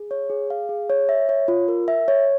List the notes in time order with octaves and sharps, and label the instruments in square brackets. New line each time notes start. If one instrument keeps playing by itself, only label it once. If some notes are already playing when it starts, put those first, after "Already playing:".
Already playing: [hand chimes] G#4
C#5
G#4
F5
G#4
C#5
E5
C#5
F4
A#4
E5
C#5